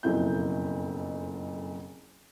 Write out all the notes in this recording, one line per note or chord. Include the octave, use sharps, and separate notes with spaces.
F#1 B1 F2 E4 G6